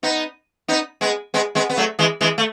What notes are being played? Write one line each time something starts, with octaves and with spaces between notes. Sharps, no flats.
B3 D#4
B3 D#4
G#3 B3
G#3 B3
G#3 B3
B3
F#3 A3
E3 G#3
E3 G#3
A3